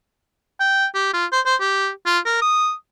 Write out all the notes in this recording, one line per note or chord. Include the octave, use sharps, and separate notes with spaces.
G5
G4
F4
C5
C5
G4
F4
A#4
D#6